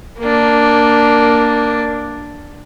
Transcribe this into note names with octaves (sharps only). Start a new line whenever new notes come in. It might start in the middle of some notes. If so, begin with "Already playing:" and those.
A#3 D4